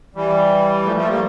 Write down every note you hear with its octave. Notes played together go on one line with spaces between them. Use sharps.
E3 G3
F3 A3
F3 A3
G3 A#3